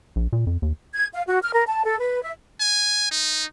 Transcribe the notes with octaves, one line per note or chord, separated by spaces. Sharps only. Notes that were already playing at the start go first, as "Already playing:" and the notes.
A#1
A#2
F2
D#2
G#6
F5
F#4
F6
A#4
A5
A4
B4
E5
G#5
D#4